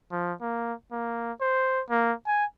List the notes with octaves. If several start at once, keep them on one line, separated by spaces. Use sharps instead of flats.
F3
A#3
A#3
C5
A#3
G#5